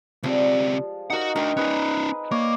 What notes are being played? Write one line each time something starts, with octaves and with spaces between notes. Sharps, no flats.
C#2 F3 G3 G#3 C4
D#4 F#4 A#4 F#5
C4 D4 F#4 A#4 G5
C#4 D#4 G#4 B4
A#3 C#5 D5